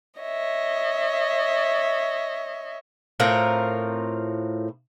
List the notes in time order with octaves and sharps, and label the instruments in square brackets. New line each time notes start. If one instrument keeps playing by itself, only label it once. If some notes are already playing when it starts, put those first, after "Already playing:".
[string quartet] C#5 D#5 E5
[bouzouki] A2 C4 F4 A#4